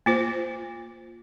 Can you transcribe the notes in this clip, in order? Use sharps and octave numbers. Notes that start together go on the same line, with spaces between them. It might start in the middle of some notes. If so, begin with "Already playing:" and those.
A#3 F4 C5